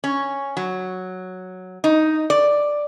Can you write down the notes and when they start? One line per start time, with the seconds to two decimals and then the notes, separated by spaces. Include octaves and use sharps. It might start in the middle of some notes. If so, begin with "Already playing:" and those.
0.04 C#4
0.57 F#3
1.84 D#4
2.30 D5